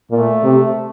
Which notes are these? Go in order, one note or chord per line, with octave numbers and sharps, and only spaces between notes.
A#2 A3
C3